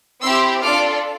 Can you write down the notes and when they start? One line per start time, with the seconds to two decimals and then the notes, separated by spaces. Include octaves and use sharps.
0.23 C4 E4 G4 C6 E6
0.63 D4 F4 A4 D6 F6